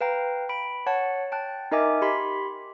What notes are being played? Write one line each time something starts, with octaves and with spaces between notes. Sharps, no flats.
B4 F5 G5 A#5
B5 D7
C#5 F#5 A5
G5 A5 F#6
D#4 A#4 D#5 E5 G#5 D6
G4 B5 C6 B6